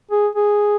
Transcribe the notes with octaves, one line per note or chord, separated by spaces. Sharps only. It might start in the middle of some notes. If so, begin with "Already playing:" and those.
G#4
G#4